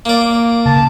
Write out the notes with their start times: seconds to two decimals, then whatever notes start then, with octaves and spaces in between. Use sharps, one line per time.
0.05 A#3 D5
0.66 C#3 A5